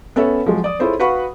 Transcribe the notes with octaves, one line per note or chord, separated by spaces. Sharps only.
B3 C#4 A4 C#5 E5
F3 F#3 G#3
D5 D#6
E4 F4 G#4 A4 C5 C#5
F#4 B4 F5 F#5 B5 C#6